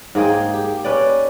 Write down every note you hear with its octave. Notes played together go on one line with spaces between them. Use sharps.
G#2 A#3 G#4 G5
G4
C#4 B4 D5